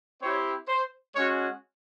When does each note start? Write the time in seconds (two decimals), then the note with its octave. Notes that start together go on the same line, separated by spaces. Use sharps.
0.20 C4 E4 G4 C#5
0.68 C5
1.14 G#3 C#4 F#4 C#5